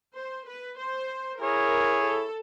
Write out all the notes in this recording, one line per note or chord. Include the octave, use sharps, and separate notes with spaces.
C5
B4
C5
E4 G#4 A#4 C#5
A4